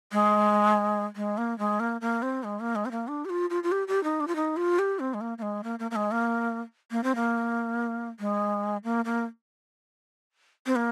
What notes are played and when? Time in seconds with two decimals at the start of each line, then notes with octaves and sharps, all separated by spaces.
0.12 G#3
1.16 G#3
1.37 A#3
1.59 G#3
1.80 A#3
2.01 A#3
2.22 C4
2.44 G#3
2.60 A#3
2.75 G#3
2.85 C4
2.91 A#3
3.08 D4
3.25 G4
3.30 F4
3.50 F4
3.63 F4
3.72 G4
3.88 G4
4.04 D#4
4.20 D4
4.28 F4
4.36 D#4
4.57 F4
4.79 G4
4.99 C4
5.14 G#3
5.21 A#3
5.38 A#3
5.42 G#3
5.64 A#3
5.79 A#3
5.91 A#3
5.96 G#3
6.11 A#3
6.91 A#3
7.04 C4
7.15 A#3
8.20 G#3
8.84 A#3
9.05 A#3
10.66 C4
10.76 A#3